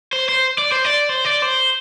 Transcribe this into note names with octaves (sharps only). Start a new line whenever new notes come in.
C5
C5
D5
C5
D5
C5
D5
C5